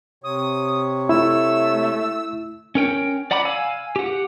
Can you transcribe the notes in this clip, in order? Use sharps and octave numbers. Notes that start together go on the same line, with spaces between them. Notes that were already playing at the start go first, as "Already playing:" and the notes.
C3 C#5 D#6
A3 E4 E6
C#4 A#4 G5
D5 F#5 A#5 B5 D6
F5 G#5 E6
G4 F#5